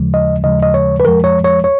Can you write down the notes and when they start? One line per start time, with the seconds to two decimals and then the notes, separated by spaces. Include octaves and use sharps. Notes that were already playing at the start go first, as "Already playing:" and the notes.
Already playing: D#2 C#3 F3 G#3
0.14 D#5
0.43 D#2 C#3 F3 G#3 D#5
0.63 D#5
0.74 C#5
1.00 B4
1.04 F2 F3 G#3 A#4
1.24 C#5
1.44 C#5
1.64 C#5